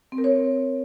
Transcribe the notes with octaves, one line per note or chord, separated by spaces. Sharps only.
C4
A#4
C#5